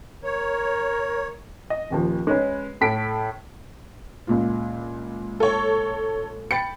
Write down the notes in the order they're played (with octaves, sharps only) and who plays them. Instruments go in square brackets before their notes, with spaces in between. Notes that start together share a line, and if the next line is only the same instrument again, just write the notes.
[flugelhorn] A#4 [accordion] C#5
[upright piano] D#5
D#1 D#2 F3
G#3 C#4 B4
A2 A4 B6 D7
[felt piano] C#2 A#2 F4
[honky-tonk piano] A4 C#5
[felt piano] G5 B5 A6 [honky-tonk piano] C#7